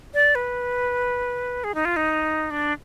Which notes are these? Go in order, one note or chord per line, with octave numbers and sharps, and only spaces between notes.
D5
B4
G#4
D#4
F4
D#4
D4